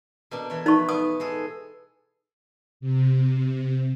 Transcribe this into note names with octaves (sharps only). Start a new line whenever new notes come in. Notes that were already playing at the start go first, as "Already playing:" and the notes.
B2 A#3 D4
E3 C#5
D#4 B4 C#6
B3 D#6
G#3 G#4 A4
C3